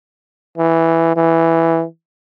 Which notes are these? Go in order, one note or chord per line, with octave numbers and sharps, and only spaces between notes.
E3
E3